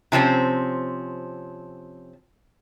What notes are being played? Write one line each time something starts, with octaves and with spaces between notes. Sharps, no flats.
C3 F3 C4 C#4